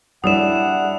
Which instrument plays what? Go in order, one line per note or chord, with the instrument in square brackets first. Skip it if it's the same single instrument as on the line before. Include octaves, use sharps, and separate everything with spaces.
[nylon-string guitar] G3 C#5 D5 [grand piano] D4 E4 [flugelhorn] F#5 [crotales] D#6 E7